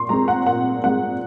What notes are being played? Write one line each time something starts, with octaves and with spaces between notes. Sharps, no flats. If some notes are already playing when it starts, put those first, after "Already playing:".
Already playing: A#2 C6 C#6
G#3 C4 A#5
F#5
A#2 F#5
G#3 C4 F#5